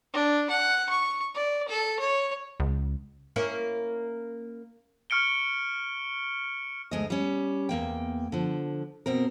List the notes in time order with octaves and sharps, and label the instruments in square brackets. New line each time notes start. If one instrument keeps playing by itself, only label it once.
[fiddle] D4
F#5
C#6
D5
A4
C#5
[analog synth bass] C#2
[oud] A#3 C#4 E4
[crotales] C#6 F6 C#7 D7 G7
[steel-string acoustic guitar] D2 G#3 D#5
G3 C#4
E2 A#3 G5
D3 F3
B2 C4 A#4